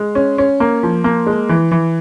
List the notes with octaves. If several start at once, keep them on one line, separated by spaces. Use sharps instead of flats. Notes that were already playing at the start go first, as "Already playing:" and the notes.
Already playing: G#3
C#4
C#4
A#3
F3
A#3
G#3
E3
E3